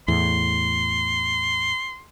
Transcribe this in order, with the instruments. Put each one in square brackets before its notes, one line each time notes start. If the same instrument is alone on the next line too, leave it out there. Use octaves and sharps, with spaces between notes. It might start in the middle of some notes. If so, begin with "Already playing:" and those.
[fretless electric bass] E2 A2 [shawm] C6